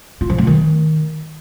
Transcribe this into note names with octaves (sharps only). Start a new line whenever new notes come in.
F4
F3
A3
D#3